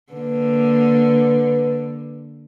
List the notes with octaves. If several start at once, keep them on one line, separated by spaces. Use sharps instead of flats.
D3 A#3 B4